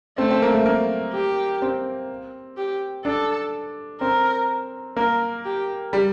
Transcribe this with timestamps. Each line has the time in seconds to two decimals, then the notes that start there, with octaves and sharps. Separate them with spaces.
0.18 A3 C4
0.30 C4
0.42 A#3
0.54 A3
0.66 A#3
1.14 G4
1.62 C4
2.57 G4
3.05 D4 A4
4.01 C4 A#4
4.97 A#3 A#4
5.45 G4
5.93 G3